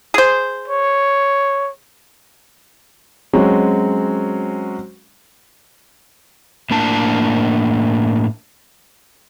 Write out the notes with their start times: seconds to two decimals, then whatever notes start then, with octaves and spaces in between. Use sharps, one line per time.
0.14 G#4 C5
0.68 C#5
3.33 F#3 G#3 C4 C#4 F#4
6.71 A2 A#3 D4 A5